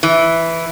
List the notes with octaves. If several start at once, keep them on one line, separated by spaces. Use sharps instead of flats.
E3